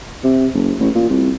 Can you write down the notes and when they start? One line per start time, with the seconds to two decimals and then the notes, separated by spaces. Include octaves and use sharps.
0.24 C3
0.54 F#1
0.80 A1
0.95 A#2
1.09 C2